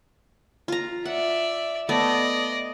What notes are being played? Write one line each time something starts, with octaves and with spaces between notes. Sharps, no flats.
F4 A#5
D5 E5 F#5
A3 B3 D5 D#5